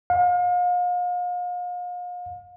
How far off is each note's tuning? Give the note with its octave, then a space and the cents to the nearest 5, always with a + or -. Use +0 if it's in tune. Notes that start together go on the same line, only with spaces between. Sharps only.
F5 +40